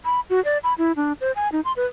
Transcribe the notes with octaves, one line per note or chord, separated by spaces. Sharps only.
B5
F#4
D5
B5
E4
D4
C5
G#5
D#4
C6
B4